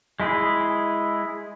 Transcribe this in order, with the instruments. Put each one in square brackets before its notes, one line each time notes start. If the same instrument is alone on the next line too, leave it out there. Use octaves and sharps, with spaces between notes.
[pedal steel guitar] G#3 E4 G#4